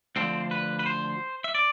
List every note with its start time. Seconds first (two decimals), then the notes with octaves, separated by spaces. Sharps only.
0.16 D2 D3 F3 C4
0.51 B4
0.79 B4
0.86 C5
1.44 E5
1.55 D5